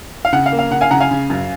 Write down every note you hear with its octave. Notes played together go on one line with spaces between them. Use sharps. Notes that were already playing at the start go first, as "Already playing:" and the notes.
F5
C#3 F#5
F5
A#3
F5
C#3 F#5
F5 G#5
C#3 F#5 A#5
F5 G#5
C#3
F#2